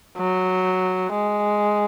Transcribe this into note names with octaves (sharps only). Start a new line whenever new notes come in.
F#3
G#3